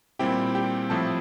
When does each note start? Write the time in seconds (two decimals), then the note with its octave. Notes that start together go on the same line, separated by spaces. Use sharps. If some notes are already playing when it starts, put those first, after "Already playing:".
0.19 A#2 G3 C4 E4 G4 G5
0.55 G4 G5
0.90 A2 F3 C4 E4 A4 A5